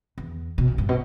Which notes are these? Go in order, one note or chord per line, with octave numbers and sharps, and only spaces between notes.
E2
B2
A#2
G2
B2